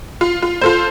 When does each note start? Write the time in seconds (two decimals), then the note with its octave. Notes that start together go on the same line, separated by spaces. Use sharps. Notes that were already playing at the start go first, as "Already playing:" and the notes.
0.21 F4
0.42 F4
0.61 F4 A4 C5